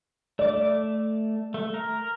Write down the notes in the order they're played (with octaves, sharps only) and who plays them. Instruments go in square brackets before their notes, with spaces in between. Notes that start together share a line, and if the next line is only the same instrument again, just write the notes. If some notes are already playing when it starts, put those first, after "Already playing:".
[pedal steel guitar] A3 D6 [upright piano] D5
[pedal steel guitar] A3
A#4